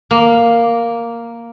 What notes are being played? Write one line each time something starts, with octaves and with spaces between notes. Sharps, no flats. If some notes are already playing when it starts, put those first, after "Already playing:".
A#3